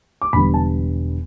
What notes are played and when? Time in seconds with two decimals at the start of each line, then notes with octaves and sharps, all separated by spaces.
0.22 D6
0.33 E1 E2 D3 G3 B3 B5
0.54 A5